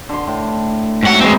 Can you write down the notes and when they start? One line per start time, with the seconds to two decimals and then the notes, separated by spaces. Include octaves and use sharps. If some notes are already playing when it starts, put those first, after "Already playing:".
0.09 D3 C6
0.27 A2
1.03 G#2 C3 F#3 A3 F#5
1.20 E3 G#3 B3 C4 D#4